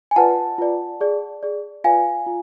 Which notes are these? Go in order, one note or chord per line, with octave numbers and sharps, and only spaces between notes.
G#5
F4 B4 D5 F#5 A5
F4 B4 D5
G#4 D5
G#4 D5
F4 B4 D5 F5 G#5
F4